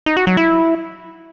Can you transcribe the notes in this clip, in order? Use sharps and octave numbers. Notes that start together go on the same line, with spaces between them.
D#4
F#4
F#3
E4